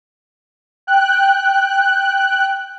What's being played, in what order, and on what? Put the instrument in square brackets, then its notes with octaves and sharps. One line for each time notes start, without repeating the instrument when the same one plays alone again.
[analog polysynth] G5 F#6